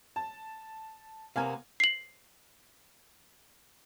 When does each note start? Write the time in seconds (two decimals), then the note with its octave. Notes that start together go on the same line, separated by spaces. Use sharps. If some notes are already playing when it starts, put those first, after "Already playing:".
0.16 A5
1.36 C3 A#3 B3 F5 G#5
1.80 C7 F#7